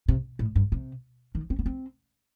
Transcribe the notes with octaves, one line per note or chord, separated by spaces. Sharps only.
C3
A2
G2
C3
D#3
C4
B3
C4